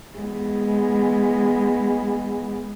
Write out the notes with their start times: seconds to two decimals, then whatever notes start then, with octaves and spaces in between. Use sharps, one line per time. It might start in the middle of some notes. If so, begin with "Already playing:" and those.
0.19 G#3 B3